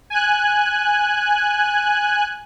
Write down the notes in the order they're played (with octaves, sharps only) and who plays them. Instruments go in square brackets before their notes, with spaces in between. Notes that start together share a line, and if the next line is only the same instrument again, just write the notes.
[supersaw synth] G#5 F#6